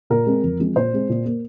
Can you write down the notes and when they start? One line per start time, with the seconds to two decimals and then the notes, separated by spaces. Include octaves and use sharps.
0.10 A#2 A#4
0.27 G#3 C4
0.44 F2
0.60 F3 G#3 C4
0.76 A#2 C5
0.93 G#3 C4
1.09 A#2
1.26 A#3